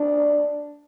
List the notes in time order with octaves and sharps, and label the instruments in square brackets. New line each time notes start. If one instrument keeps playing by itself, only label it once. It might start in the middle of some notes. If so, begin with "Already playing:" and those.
Already playing: [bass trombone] D4